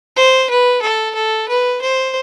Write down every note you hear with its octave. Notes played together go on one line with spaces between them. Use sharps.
C5
B4
A4
A4
B4
C5